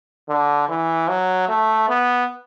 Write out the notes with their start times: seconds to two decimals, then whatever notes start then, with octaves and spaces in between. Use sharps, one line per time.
0.29 D3
0.69 E3
1.08 F#3
1.48 A3
1.89 B3